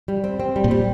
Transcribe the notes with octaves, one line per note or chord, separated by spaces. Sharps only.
G3
C4
C4
G3
A#2
G3